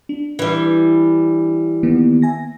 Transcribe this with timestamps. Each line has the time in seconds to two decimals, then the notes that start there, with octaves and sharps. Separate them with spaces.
0.09 D4
0.39 E3 G3
1.83 D#3 A#3 B3
2.22 E5 G#5 A#6